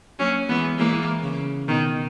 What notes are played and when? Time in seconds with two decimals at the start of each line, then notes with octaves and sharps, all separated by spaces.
0.19 F#3 A#3 C#4
0.49 E3 G#3 B3
0.78 E3 G#3 A#3
1.24 C#3
1.68 B2 D#3